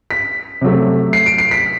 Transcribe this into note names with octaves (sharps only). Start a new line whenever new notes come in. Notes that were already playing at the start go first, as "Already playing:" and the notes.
B6
C3 F#3 A3
C7
D7
C7
B6